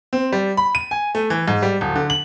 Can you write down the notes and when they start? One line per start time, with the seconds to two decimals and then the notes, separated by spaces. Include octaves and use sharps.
0.13 C4
0.33 G3
0.57 B5
0.75 D#7
0.91 G#5
1.15 A3
1.30 E3
1.48 G#2
1.63 G3
1.81 D1
1.96 D3
2.10 F#7